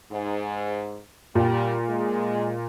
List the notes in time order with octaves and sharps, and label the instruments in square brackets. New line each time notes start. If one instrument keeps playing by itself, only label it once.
[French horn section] G#2
[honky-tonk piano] A#2 [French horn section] G3
[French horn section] G#3